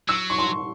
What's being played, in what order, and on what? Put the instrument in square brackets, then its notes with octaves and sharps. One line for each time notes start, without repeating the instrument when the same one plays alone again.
[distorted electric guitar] F#3 [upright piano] E6
[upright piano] C#6
C6